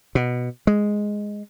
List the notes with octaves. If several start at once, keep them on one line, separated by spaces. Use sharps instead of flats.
B2
G#3